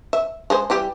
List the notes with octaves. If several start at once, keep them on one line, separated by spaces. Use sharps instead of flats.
E5
G#3 G#4 C5
E3 G3 G4